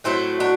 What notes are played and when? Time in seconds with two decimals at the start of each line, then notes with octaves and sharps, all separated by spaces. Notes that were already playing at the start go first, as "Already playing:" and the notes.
0.04 A2 F#3 A3 C4 E4
0.40 D4 F#4